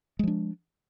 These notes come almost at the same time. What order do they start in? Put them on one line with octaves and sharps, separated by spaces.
G#3 F3 D4